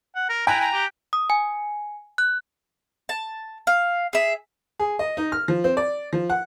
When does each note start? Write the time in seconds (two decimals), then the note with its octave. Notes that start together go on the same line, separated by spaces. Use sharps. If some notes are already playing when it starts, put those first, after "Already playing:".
0.16 F#5
0.29 A#4
0.47 E4 G5 G#5 A#5 F#6
0.61 A#5
0.73 G4
1.13 D#6
1.30 G#5
2.18 F#6
3.09 A5
3.67 F5
4.13 G#4 E5
4.80 G#4
4.99 D#5
5.17 D#4
5.32 F6
5.48 F3
5.64 C4
5.77 D5
6.13 F3
6.30 F#5